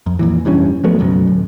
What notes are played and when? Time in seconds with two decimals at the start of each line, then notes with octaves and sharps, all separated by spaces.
0.06 F2
0.19 F2 A#2 E3
0.45 F1 G2 E3 C#4
0.84 F3 F#3 A3 B3
0.99 F#1 B1 F#2
1.27 D1